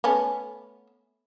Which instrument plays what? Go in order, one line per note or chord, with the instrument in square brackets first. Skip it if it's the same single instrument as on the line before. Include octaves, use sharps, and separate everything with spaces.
[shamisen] A3 B3 C#4